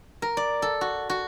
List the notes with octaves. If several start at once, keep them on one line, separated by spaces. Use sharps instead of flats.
A#4
D5
A4
F#4
F#4